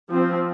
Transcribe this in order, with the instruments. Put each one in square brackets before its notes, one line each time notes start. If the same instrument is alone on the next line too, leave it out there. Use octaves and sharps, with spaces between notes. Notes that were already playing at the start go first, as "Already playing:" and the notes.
[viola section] F3 C4